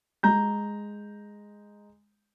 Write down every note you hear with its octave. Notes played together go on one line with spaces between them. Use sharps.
G#3 A#5 G6